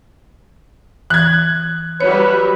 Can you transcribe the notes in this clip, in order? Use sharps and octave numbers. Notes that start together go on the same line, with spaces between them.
E3 F#6 G#6
F#3 G3 B4 C#5 E5